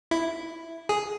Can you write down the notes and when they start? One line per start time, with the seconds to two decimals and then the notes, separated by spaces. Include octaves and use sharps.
0.11 E4
0.89 G#4